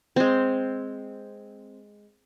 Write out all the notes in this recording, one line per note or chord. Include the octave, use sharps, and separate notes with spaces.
G#3 C4